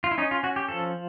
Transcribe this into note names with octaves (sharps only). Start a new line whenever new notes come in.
F4
E4
C#4 D#4
F4
C#4 F#4
G4
F3 A4